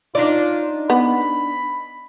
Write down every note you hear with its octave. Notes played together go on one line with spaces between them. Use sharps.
D4 D#4 F4 D5
B3 B5